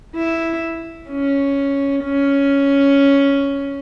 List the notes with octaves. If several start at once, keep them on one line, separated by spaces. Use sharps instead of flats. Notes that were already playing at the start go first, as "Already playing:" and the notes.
E4
C#4
C#4